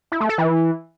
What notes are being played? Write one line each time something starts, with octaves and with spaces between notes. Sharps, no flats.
E4
A3
A4
E3